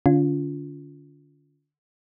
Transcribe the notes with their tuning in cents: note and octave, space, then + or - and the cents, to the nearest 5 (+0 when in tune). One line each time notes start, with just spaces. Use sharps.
D3 +5 C#4 +40 F4 +10